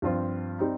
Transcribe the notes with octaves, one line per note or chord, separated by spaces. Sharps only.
G2 F3 C4 F4 C5
G3 C4 D#4